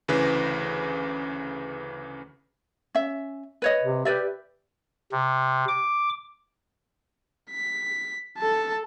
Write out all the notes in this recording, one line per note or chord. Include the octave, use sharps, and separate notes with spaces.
D2 C#3 E3 B4 A#6
C#4 E5
B4 C#5 D#5
C3
G4 B4 D5 E5
C3
D6
B6
A4 A5